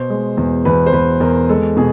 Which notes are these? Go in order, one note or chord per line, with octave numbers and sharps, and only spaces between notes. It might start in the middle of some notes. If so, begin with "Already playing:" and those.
Already playing: B2 C5
G#3
E2
E2 B4
C5
E2 B4
E2 A#4
G#3 A4
B2 G#4